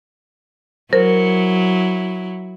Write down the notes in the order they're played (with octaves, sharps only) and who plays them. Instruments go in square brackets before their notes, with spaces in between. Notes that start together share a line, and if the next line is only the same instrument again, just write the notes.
[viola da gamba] F#3 E4 [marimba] A#4 [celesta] C5